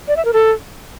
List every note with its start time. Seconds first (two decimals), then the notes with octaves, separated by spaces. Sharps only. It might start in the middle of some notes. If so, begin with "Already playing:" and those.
0.08 D5
0.16 E5
0.25 A#4
0.33 A4